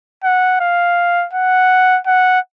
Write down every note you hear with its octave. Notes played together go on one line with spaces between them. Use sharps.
F#5
F5
F#5
F#5